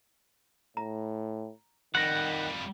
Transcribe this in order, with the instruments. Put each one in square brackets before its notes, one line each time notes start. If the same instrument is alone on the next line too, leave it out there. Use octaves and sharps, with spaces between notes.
[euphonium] A2 [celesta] A#5
[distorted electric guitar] F2 G3 [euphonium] D#3 [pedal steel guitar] F#5 [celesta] F#6 A#6